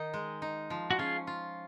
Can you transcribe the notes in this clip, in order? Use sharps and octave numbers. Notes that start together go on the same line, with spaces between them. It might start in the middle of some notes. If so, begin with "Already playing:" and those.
Already playing: D#3 D#4
G#3
D#4
F3
F#4
C#4 F4 G#4
F4